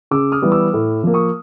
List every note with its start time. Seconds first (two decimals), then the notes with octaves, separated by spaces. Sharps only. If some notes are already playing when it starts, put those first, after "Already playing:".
0.11 C#3 D6 E6
0.32 D#6 F6
0.42 E3 G3 B3
0.52 D6 E6
0.74 A2
1.03 F3 A#3
1.14 C#6 D#6